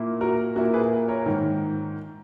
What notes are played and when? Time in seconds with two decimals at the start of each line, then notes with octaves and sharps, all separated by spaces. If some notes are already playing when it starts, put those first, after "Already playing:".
Already playing: A#2 A#3 E4
0.21 F#4 A#4
0.56 A#2 A#3 E4 F#4 A#4
0.74 G#4 B4
1.08 A#4 C#5
1.26 G#2 D#3